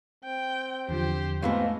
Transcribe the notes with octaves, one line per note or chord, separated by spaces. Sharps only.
C4 G5
E2 D3 F3 G4 C5
F2 G#2 G#3 A3 B3 F5